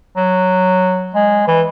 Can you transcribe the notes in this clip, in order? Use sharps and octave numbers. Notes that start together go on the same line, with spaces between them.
F#3
G#3
E3